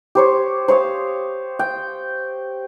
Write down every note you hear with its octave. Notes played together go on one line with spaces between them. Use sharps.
G4 C5 C#5
C5 C#5 F5 D#6
G5